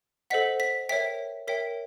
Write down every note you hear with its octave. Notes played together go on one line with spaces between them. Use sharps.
A4 C5 D#5 F#5 B6
B6
A#4 C#5 E5 G5 B6
A#4 C#5 E5 G5 B6